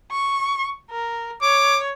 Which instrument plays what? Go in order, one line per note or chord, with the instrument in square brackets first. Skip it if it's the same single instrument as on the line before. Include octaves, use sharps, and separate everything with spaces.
[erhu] C#6
A#4
[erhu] C#5 [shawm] D6